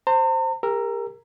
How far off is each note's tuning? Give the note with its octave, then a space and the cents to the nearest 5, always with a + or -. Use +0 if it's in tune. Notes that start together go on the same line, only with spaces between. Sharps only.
C5 +0 A#5 -45
G4 +45 A#4 +0 E6 +30